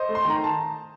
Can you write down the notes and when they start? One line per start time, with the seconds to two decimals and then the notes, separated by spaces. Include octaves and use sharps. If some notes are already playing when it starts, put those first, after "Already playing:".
Already playing: C5 D#5
0.09 A3
0.15 C6
0.25 D#3 A#5
0.44 A5